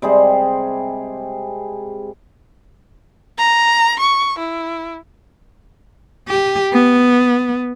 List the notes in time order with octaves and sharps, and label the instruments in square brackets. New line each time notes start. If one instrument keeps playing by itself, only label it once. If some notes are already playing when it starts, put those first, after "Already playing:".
[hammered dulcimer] C3 G3 G#3 G#4
[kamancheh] A#5
C#6
E4
[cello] G4
B3